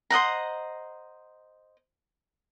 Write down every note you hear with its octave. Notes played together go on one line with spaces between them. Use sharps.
C5 D#5 F#5 A#5